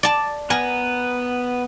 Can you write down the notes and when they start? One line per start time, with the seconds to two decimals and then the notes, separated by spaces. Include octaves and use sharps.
0.03 D5 A5
0.50 B3 A#4 G#5